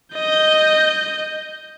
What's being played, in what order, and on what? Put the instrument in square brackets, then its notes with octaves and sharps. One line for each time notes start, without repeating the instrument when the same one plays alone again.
[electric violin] D#5 G6